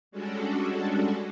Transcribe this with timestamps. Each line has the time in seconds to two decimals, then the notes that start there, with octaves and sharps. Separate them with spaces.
0.11 G3 G#3 C#4 D4 F#4 A4